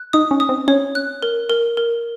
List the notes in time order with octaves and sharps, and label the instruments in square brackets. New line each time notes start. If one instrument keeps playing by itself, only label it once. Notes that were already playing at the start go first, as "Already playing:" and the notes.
Already playing: [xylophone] F#6
[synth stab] D#4 [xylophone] D#6
[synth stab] C#4
[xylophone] D#6
[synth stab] C4
[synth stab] C#4 [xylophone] C#5
[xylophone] F#6
A#4
A#4
A#4